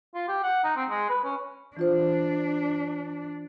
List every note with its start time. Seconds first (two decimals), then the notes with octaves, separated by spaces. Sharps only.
0.15 F4
0.28 G4
0.43 F#5
0.64 D#4
0.76 C4
0.90 G#3
1.09 B4
1.24 C#4
1.77 E3 D4 F4 C5